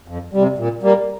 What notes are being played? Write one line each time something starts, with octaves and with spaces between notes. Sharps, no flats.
F2
C3 G3
A#2
G3 A#3